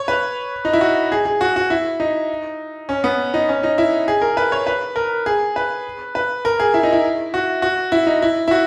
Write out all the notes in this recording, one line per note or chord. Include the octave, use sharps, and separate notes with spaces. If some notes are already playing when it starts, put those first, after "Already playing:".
Already playing: C#5
B4
D#4
E4
F#4
G#4
G#4
F#4
F#4
E4
D#4
C#4
B3
D#4
C#4
D#4
E4
G#4
A#4
B4
C#5
B4
A#4
G#4
B4
B4
A#4
G#4
E4
D#4
E4
F#4
F#4
E4
D#4
E4
E4
F#4